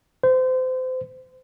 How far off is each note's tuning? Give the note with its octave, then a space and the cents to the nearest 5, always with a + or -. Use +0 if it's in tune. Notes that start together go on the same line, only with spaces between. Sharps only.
C5 -30